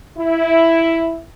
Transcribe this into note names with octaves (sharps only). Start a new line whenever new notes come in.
E4